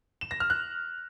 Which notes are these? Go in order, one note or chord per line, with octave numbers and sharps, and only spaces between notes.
E7
A#6
F6
F#6